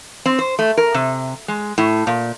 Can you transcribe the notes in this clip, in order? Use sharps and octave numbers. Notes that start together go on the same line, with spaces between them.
C4
C5
A3
A#4
C3
G#3
A2
A#2